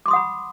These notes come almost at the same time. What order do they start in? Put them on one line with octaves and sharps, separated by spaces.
D6 C6 D#6 F#5 B5